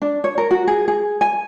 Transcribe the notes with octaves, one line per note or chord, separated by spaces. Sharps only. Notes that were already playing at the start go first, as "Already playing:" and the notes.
D4
C#5
A#4
F#4
G#4
G#4
G#5